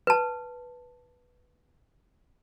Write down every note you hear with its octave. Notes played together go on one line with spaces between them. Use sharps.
B4 A5